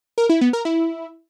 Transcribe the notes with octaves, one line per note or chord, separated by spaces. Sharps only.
A#4
E4
B3
A#4
E4